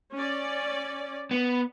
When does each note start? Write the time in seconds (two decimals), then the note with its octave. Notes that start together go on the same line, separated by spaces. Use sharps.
0.14 C#4 D5
1.31 B3